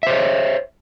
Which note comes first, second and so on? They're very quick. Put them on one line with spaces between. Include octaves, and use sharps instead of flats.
E5 C5 C#5